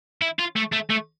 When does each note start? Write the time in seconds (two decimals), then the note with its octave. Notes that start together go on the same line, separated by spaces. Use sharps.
0.22 E4
0.39 F4
0.56 A3
0.73 A3
0.90 A3